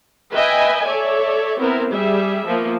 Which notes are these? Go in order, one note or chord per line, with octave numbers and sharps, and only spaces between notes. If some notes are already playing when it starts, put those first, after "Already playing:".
B4 D#5 E5 G5 G#5
A4 C#5 D5 E5
B3 C4 E4 A#4
G3 G#4 E5
F3 A#3 B3